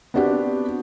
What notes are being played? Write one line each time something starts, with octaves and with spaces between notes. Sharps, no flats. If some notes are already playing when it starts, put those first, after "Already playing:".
B3 C4 D4 F#4 G4